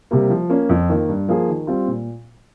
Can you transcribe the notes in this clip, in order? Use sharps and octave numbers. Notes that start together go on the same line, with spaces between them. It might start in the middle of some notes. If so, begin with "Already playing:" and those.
C3 G3 A#3
F3
A#3 C#4
F2
D#3 A#3
G2
F3 A#3 F4 G#4
D#3
G3 C4 F4
A#2